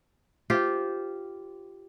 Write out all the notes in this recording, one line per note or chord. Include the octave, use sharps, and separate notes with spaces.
F4 G4 C5